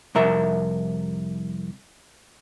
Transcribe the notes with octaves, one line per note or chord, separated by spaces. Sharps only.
C2 F2 A#4 E5